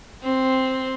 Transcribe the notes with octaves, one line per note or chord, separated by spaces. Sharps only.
C4